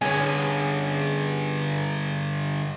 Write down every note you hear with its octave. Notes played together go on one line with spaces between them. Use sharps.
G2 D3 C#4 G#4